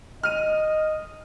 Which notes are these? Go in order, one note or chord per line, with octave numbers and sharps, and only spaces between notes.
D#5 F6 D#7